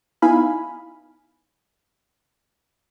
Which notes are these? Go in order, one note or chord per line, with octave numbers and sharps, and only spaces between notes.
B3 D#4 E4 F5 G#5 B5